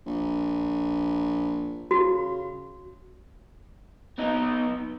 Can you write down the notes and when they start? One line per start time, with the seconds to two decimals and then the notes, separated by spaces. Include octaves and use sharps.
0.06 A#1
1.91 C#3 F#4
4.18 B3 D#4